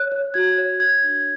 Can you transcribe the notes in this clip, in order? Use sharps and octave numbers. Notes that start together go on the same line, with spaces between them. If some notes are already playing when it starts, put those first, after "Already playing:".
Already playing: C#5 F#6
C#5
F#4 G#6
C#5
C#5 G#6
D4